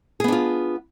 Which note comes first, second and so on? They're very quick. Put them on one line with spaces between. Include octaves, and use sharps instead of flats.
G#4 B3 D4 F4